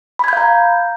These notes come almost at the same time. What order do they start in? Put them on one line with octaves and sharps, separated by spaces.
B5 G#6 G6 F5 A#5